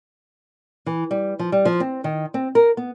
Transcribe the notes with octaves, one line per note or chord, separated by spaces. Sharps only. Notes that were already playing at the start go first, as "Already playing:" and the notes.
E3
G3
F3
G3
F3
C4
D#3
C4
A#4
B3